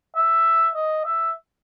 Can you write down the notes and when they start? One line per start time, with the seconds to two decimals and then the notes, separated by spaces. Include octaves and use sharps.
0.17 E5
0.75 D#5
1.05 E5